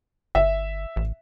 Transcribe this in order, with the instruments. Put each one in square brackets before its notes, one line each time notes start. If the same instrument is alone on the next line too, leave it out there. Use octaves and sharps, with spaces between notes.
[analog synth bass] G1 [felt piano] E5
[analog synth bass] A1